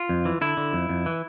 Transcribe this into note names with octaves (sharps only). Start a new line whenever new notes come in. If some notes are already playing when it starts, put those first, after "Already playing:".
Already playing: F4
F2
E3
D3 E4
D3
F2
F2
E3